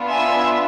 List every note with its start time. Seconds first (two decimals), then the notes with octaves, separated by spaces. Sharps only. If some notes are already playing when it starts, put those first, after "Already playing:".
Already playing: B3 D4 F4
0.10 E5 G#5